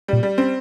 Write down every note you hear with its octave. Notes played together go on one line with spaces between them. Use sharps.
A#2 G3
G3
C4